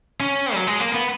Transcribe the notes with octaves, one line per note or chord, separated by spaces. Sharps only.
C#4
F#3
G#3
A#3
B3